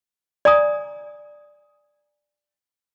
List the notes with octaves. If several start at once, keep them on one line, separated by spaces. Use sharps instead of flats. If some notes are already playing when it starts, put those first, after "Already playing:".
D5 G#5 A#5 D#6